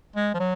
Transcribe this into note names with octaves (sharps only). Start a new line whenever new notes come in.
G#3
F3
F#3